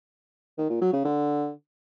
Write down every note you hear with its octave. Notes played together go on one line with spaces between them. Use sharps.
D#3
A#2
F#3
C#3
D3